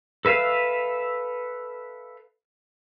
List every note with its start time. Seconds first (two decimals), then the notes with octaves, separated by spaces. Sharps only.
0.25 A4 B4 E5 F5